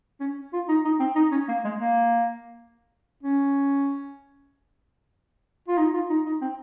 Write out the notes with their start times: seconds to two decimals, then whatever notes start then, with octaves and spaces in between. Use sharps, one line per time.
0.20 C#4
0.53 F4
0.68 D#4
0.84 D#4
1.00 C4
1.15 D#4
1.31 C#4
1.48 A#3
1.64 G#3
1.79 A#3
3.23 C#4
5.68 F4
5.77 D#4
5.94 F4
6.10 D#4
6.26 D#4
6.41 C4